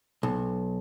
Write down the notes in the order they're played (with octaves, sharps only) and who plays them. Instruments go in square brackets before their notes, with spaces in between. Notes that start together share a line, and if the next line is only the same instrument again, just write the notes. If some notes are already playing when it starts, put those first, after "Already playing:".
[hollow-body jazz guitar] B1